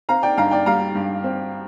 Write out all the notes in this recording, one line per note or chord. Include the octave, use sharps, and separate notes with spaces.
C4 F5 A#5
D5 G5
G2 F5 A#5
D5 G5
G3 F5 A#5
G2
C4